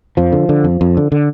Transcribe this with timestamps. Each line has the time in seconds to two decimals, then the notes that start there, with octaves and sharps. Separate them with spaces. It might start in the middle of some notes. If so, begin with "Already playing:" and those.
0.17 F2 F3
0.32 D3
0.49 D3
0.64 F2
0.81 F2
0.97 D3
1.12 D3